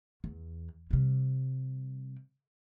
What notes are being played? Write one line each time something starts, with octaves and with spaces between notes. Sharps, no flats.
E2
C3 G3